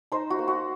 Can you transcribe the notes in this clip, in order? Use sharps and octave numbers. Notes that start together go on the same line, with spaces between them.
D#4 C5
F#4
A#3
F#4